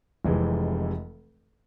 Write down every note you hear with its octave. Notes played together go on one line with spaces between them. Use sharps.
F1 F2 C3 E3 G#3